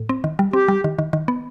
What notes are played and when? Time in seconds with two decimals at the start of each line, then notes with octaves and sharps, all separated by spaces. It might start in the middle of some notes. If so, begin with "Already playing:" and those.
Already playing: A2
0.09 C4
0.24 D#3
0.39 G3
0.53 C4 G4
0.68 G3
0.84 D#3
0.99 D#3
1.13 D#3
1.28 B3